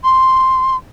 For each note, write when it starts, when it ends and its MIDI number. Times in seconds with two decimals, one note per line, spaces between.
0.04 0.77 84